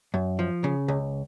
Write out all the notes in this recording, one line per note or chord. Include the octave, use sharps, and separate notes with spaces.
F#2
F3
C#3
C#2